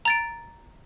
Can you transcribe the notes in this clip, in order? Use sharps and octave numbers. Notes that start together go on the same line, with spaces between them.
A#5 A6 D7